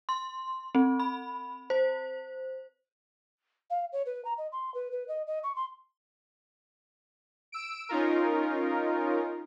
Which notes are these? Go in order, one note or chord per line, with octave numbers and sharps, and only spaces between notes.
C6
C4
B5
C5
F5
C#5
B4
A#5
D#5
C6
B4
B4
D#5
D#5
C#6
C6
E6 D7
C#4 D#4 F4 A#4